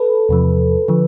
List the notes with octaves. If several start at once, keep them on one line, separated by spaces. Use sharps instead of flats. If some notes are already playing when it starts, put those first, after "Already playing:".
Already playing: A4 B4
E2 C3 F3
D3 F3